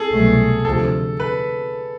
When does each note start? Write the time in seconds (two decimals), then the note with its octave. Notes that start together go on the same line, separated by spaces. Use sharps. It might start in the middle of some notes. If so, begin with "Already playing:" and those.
Already playing: G#4 A4
0.11 C2 B2 F#3 A3
0.65 D2 C3 F3 A4
1.20 B4